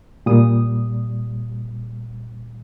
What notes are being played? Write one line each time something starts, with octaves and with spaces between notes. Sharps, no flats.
A#2 G3 D#6